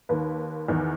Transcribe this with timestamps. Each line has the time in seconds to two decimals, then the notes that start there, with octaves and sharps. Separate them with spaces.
0.09 D#2 D#3 B4
0.68 E2 D#3